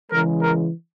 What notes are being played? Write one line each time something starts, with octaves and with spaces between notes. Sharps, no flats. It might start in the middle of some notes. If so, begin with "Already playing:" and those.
C#3 E3 G#3 A#4
A#4